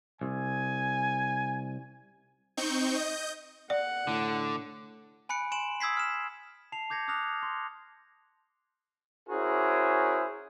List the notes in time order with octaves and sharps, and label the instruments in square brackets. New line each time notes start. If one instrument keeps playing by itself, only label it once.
[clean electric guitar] C2 [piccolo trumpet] G#5
[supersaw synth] C4 D#4 C#6 G6
D#5 G6
[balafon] D5 [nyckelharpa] F#5
[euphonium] A2 [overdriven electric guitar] D3
[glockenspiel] G#5 B5 F#6 C#7 D7
G#5 C6 D7 E7 F#7
D#6 E6 G#6 B6 C7
F6 E7
A5 C7 F7
D6 G6 G#6 A#6 C#7
D6 D#6 F6 F#6 A#6 F7
C6
[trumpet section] C#4 E4 F#4 G#4 A#4 C5